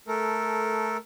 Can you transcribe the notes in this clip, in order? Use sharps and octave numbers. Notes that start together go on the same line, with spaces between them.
A3 A4 A#4